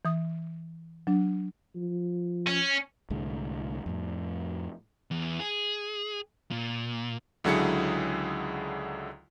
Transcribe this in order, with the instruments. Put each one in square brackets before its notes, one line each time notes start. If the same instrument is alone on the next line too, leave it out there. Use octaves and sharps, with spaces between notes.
[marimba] E3 D#6
F#3 D4
[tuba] F3
[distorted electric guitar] C#4
[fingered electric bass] C2 A2 D3 G#3
F2 A2
[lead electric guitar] E2
G#4
A#2
[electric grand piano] C#2 D3 F#3 E4 G#4 C#7